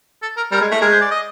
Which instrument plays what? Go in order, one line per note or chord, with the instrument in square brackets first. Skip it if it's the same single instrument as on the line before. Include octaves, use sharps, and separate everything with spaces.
[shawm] A4
A#4
[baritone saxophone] G3 [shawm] A#4
[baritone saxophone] G#3
A3
[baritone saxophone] G#3 [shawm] A#4
[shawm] C5
D5
D#5